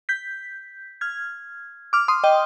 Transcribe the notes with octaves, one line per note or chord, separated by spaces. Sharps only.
G6 B6
F6 G#6
D6 F6
C6 D#6
D#5 G5